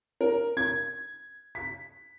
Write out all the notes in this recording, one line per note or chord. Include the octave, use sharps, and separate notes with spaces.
A#4
G#6
B6